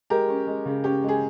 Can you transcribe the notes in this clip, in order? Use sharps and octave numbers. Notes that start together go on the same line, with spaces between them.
G#3 G4 A#4
C#4
G#3
C#3
C#4 G4
G#3 G#4